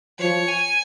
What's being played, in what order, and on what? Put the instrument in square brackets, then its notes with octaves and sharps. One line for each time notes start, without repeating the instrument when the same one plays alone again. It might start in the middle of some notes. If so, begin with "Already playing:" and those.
[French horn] F3 [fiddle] C#5
[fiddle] G#5